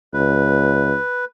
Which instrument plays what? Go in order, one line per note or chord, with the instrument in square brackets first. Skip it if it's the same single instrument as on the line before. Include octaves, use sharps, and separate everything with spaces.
[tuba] C#2 [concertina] B4